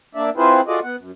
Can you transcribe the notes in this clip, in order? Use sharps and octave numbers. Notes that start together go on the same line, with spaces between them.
A#3 D4 D5 E5
C4 E4 F4 G#4 B4 C5
F4 F#4 G#4 A4 D5 D#5
B3 F#5
F#2